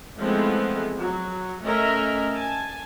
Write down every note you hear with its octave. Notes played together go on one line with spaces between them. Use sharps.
E3 F3 G#3 A3 B3 C4
F#3
A3 C#4 A#4 D#5 E5
G#5 A5